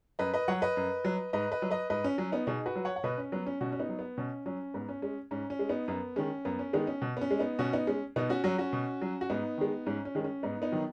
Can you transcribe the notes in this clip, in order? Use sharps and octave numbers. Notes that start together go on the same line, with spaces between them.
F#2 B4 D#5
B4 D#5
F#3 C#5 F#5
B4 D#5
F#2
F#3
G#2 B4 D#5
B4 D#5
F#3
B4 D#5
G#2 B4 D#5
C#4
F#3 C#4
B3 D#4
B2 D#4 G#4
F#4 B4
F#3
C#5 F#5
F#5
B2 B4 D#5
C#4
F#3 B3
C#4
B2 C#4 F#4
C#4
B3 D#4
F#3
B3
B2 C#4
F#3 C#4
G#2 B3
C#4
G#3 C#4
G#2 C#4
C#4
G#3
B3 D#4
F#2 B3
D#3 G#3 C#4
F#2 B3
C#4
D#3 G#3 B3 D#4
C#4
B2
B3
C#4
G#3
B3 D#4
B2 C#4 F#4
B3 D#4
G#3 C#4
B2 B3 D#4
C#4 F#4
F#3 C#4 F#4
C#4 F#4
B2
F#3
F#4
G#2 B3 D#4
D#3 G#3
G#2 C#4
C#4
D#3 G#3
C#4
G#2 B3 D#4
B3 D#4
D#3 F#3